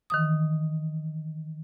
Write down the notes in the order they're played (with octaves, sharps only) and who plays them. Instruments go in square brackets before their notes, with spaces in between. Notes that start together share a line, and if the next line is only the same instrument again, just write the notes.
[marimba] D#3 E3 D#6